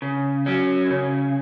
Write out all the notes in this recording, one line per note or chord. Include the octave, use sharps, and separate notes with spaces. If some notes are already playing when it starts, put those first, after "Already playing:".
C#3
F#3 C#4
C#3